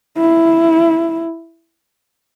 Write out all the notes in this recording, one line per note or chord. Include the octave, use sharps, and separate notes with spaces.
E4